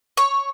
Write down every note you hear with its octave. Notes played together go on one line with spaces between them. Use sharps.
C#5